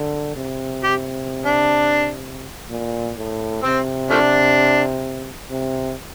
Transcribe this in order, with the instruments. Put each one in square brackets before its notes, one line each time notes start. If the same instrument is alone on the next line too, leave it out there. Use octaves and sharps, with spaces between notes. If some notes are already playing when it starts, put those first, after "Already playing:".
Already playing: [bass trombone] D3
C3
[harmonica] G4
D4
[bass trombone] A#2
A2
[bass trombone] C3 [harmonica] C4
[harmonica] F3 A3 D4
[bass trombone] C3